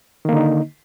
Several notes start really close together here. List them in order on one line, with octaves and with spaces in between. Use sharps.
D#3 A#3 D3 D#4